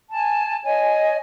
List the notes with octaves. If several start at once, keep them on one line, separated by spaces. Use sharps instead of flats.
G#5 A5
C#5 D#5 G#5